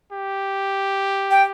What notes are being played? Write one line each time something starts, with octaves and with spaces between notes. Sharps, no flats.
G4
G5